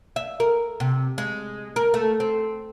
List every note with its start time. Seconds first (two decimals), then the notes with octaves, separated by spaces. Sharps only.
0.16 E5
0.40 A#4
0.80 C3
1.18 G#3
1.76 A#4
1.94 A3
2.20 C4